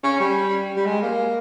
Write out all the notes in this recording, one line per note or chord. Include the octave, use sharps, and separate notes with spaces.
C#4
G3
G3
G#3
A#3